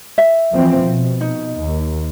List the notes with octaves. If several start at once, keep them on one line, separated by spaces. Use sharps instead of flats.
E5
E3 F3 C4
B2
D#4
D#2